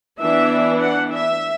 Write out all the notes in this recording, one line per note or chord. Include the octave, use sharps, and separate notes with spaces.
E3 B3 D4 E5
F#5
E5